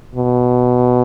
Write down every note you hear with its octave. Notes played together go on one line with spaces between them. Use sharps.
B2